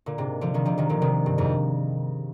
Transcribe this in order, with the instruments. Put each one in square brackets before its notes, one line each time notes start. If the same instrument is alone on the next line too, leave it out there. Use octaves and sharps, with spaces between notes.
[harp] A#2 D3
G#2 C3
D3 F3
C3 D#3
D3 F3
C3 D#3
A#2 D3
C3 D#3
G2
F2 G#2